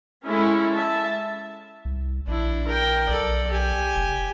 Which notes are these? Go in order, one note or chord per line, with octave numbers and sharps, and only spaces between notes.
G#3 C#4 E4 A4
E5 A5
C2
A#1 D4 E4
A#4 G5
B1 A4 D5
G4 G#5
F1